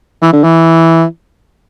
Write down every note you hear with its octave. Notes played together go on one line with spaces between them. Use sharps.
E3
D3
E3